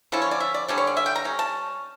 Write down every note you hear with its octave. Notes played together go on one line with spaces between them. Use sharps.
D3 F3 C#4 E4 A4
C#5
D5
E5
D5
D3 G3 C#4 D5
C#5
D5
E5
G5
A#5
G3 C#4
A5